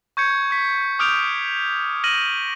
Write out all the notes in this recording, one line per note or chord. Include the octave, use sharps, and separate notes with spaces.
C#6 G6 G#6 C#7
C#6 B6
D6 D#6 F6 G6 D7 F7
F6 A#6 D#7 F#7